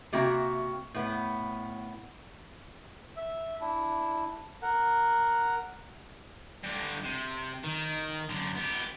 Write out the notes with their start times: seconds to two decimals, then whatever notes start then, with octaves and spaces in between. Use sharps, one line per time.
0.13 C3 A#3 F#4 E5 G5 A#5
0.94 A2 B3
3.17 E5
3.61 D4 E4
4.62 A#4 F#5
6.63 G2 D3
7.04 C3
7.63 D#3
8.29 F#2 D3
8.55 B3 G4